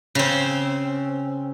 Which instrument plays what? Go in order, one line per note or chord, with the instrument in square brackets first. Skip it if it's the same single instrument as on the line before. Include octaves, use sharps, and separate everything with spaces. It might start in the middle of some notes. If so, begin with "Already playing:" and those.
[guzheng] C#3 C4